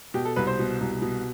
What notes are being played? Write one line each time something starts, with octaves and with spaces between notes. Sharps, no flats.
B2 G4
A4
C2 B4
C5
B2
C2
B2